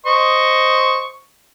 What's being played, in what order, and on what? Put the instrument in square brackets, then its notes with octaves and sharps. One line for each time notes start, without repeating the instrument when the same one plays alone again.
[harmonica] C5 D#5 C#6